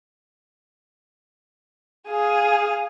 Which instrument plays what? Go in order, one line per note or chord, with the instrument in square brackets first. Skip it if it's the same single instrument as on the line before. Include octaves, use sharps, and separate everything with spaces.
[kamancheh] G#4 F5